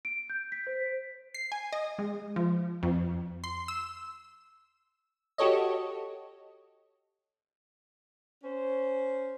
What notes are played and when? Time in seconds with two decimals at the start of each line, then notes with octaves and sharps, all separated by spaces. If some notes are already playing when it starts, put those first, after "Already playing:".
0.05 D7
0.30 G6
0.52 B6
0.67 C5
1.34 C7
1.52 G#5
1.73 D#5
1.99 G#3
2.36 F3
2.83 F2
3.44 C6
3.68 E6
5.38 F#4 G4 A4 C#5 D#5
8.44 C#4 C5